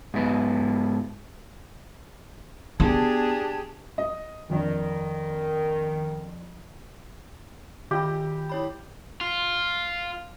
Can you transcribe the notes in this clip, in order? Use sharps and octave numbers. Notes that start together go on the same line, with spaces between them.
G#2 B3
B3 D4 G4 G#4 A5 G#6
D#5
F2 D#3 D4
D#3 F4 G4 B5
E4 C#5 B5
F4